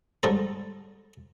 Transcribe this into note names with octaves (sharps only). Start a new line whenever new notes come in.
G#2 G3 A4 A#5